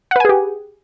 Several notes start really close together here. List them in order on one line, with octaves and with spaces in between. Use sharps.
F#5 B4 G#5 G#4 G4